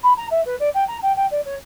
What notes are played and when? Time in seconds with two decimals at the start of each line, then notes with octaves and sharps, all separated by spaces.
0.03 B5
0.17 A#5
0.30 E5
0.45 B4
0.59 D5
0.74 G5
0.88 A#5
1.02 G5
1.16 G5
1.31 D5
1.45 C#5